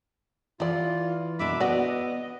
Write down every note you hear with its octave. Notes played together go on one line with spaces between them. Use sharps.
E3 E4 F4 D5
B2 A#3 D4 E5 B5 D6
B3 F#4 D5 D#5